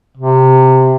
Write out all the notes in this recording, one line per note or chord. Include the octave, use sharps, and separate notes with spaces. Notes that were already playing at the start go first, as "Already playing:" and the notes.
C3